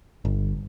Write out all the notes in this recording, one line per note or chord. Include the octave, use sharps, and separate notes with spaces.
G1